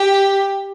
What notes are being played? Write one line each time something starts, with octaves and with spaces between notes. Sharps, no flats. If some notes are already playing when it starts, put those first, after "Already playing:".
Already playing: G4